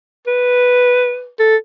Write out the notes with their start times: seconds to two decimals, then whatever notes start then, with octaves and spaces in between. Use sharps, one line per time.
0.27 B4
1.39 A4